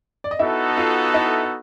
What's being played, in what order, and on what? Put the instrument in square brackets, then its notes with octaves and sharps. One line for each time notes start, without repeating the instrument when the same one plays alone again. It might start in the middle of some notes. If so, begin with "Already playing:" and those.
[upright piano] D5
D#5
[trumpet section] B3 D#4 F#4 A4 [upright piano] E4 E5
[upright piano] F4 F5
E4 E5